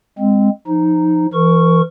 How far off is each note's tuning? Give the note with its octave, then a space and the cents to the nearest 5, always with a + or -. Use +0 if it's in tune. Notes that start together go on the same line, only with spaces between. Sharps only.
G#3 -15 C4 +0
F3 +0 D#4 +0
E3 +40 A#4 -15 C#6 +0